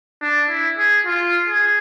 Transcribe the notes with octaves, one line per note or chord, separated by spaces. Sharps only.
D4
E4
G#4
F4
G#4